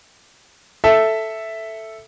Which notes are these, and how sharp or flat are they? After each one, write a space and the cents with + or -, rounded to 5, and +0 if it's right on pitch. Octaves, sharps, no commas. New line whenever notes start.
A4 +0 E5 +0